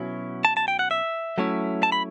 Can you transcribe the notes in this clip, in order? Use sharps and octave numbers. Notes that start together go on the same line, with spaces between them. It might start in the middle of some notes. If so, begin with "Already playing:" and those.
Already playing: B2 F#3 C#4 E4
A5
A5
G5
F#5
E5
F#3 A3 C#4 E4
A5
B5